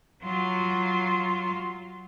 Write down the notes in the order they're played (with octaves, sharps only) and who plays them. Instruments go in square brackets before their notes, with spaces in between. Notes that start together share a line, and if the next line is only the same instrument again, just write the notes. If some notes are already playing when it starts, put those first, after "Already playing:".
[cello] F#3 F4